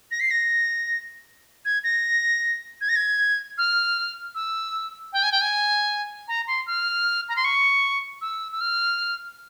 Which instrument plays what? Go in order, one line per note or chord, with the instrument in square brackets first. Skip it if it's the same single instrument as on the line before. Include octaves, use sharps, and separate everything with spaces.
[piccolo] A#6
C7
A#6
G#6
A#6
G#6
A#6
G#6
F6
E6
G5
G#5
G5
G#5
A#5
C6
F6
A#5
C6
C#6
E6
E6
F6